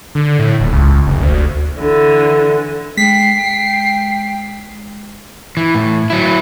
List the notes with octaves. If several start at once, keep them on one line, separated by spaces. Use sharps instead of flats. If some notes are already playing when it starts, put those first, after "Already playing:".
D3
A2
D#1
C#2
F1
D2
D3 E3
G#3 G5 B6 C7
E3
A2
F#3 E4